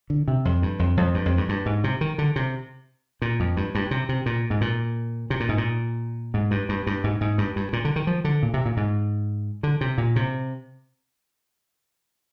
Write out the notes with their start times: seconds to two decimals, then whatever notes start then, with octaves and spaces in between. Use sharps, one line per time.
0.10 D3
0.28 C3
0.45 F2
0.62 G2
0.79 F2
0.97 F2
1.14 G2
1.26 F2
1.37 G2
1.49 G2
1.66 G#2
1.84 C3
2.01 D#3
2.18 D3
2.36 C3
3.22 A#2
3.40 F2
3.57 G2
3.75 G2
3.91 C3
4.09 C3
4.26 A#2
4.50 G#2
4.61 A#2
5.30 C3
5.40 A#2
5.49 G#2
5.58 A#2
6.34 G#2
6.51 G2
6.69 G2
6.87 G2
7.04 G#2
7.21 G#2
7.38 G2
7.56 G2
7.73 A#2
7.85 D3
7.96 D#3
8.07 F3
8.24 D3
8.43 A#2
8.54 C3
8.66 A#2
8.77 G#2
9.63 D3
9.81 C3
9.98 A#2
10.16 C3